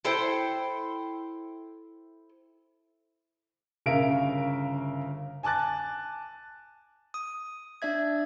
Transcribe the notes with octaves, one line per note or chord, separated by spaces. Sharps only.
E4 A4 C5 G5
G1 C#3 A#4 E5 F5 D7
G#5 A5 D6 F#6 A6
D#6
D4 D5 E5 G#6